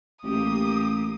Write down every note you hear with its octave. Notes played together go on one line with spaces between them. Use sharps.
A1 A#3 G4 D#6